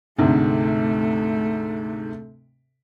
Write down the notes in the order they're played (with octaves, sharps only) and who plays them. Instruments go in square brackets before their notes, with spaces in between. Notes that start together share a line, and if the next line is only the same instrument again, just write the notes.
[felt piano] D2 G#2 C3 [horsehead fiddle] A3